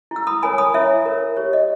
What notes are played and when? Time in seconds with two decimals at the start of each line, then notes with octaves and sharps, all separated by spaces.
0.11 E4
0.16 E6
0.27 B5 D#6
0.43 A#4 C#5 G#5 B5
0.58 B5 D#6
0.74 E4 C#5 E5
1.06 A#4 C#5
1.37 G4 C#5
1.53 D#5